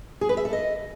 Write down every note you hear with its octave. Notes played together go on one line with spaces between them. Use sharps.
G#4
B4
E5
A4
D#5